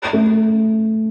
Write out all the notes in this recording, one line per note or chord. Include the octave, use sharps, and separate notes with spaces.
A3